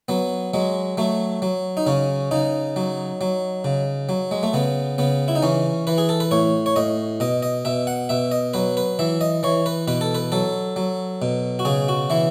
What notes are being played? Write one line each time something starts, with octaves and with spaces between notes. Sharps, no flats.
F#3 B3
F#3 G#3
F#3 A3
F#3
D#4
C#3 C#4
C#3 D#4
F#3
F#3
C#3
F#3
G#3
A3
C#3 B3
C#3 B3
E4
D#4
E3 C#4
E3 B4
G#4
A4
B4
A2 C#5
C#5
A2 D#5
B2 D#5
D#5
B2 E5
F#5
B2 E5
D#5
F#3 B4
B4
E3 E5
D#5
E3 C#5
B4
B2 B4
A4
B4
F#3 A4
F#3
B2
F#4
C#3 G#4
F#4
E3 E4